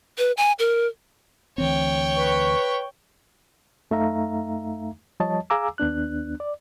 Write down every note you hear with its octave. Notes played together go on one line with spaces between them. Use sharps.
B4
G#5
A#4
D2 E3 C4 C#5 G5
B4 C#6
F#2 A3 D#4 E5 F5 A#5
F3 G3 C#5 D#5 A5
G#4 F5 G#5 A#5 D6 E6
D#2 B3 D4 F#6
D5